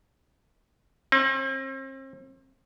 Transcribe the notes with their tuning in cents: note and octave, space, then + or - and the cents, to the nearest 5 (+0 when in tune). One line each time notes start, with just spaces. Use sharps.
C4 +40